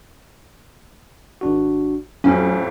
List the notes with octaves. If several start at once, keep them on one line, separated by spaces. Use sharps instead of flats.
G#1 D4 F#4
A1 F2 F#3 C#4